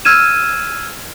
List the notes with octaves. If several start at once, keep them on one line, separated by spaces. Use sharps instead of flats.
E6 F6 G#6 D#7 E7